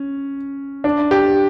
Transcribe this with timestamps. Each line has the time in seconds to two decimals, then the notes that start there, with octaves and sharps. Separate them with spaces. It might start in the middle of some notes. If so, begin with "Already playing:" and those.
Already playing: C#4
0.84 D4
1.11 G4